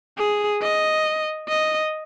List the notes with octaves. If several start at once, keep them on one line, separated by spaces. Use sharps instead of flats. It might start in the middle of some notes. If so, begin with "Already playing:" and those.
G#4
D#5
D#5